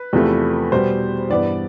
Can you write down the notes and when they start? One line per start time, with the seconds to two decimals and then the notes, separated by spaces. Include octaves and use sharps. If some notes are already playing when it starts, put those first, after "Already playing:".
Already playing: B4
0.13 E2 C3 F3 A3
0.72 B2 G3 B3 C5
1.30 G2 E3 B3 D5